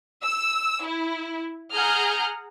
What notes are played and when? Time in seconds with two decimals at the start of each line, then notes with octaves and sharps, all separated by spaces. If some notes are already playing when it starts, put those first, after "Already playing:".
0.24 E6
0.85 E4
1.74 G#4 F#5 A#5 F6 G6